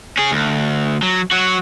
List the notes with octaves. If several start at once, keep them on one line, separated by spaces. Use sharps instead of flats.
C#4 G#4
D2
F#3
F#3 F#4